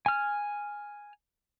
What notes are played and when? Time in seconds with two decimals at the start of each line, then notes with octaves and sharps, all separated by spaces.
0.06 G#5 F6